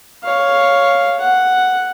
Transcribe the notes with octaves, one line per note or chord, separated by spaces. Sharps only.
C#5 F5
F#5